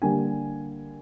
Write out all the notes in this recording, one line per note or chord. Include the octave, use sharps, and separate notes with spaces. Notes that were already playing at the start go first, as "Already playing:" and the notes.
D3 G3 A#3 G#5